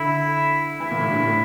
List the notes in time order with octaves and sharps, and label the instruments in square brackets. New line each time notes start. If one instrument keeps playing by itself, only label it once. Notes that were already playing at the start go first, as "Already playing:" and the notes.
Already playing: [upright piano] D3 [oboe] E4
[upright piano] E3 [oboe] E4
[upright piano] A#2
A2
G2
A2